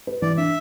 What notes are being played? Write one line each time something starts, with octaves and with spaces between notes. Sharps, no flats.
B4
E3 D5
D4 E5